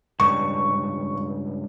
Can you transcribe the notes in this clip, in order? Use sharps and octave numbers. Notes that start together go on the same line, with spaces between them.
C#2 G2 C#6